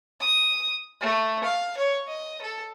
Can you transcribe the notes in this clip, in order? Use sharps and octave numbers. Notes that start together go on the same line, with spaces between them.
D#6
A3
F5
C#5
D#5
A4